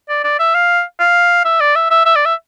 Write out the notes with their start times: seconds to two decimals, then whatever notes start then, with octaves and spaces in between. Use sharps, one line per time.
0.09 D5
0.24 D5
0.39 E5
0.55 F5
1.00 F5
1.45 E5
1.60 D5
1.75 E5
1.91 E5
2.06 E5
2.16 D5
2.25 E5